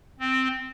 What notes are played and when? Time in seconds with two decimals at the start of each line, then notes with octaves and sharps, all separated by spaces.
0.20 C4